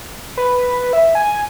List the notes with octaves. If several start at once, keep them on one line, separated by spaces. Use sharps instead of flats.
B4
E5
G#5